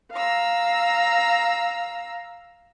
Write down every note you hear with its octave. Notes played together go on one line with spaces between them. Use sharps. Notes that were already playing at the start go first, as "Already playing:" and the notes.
F5 A#5 E6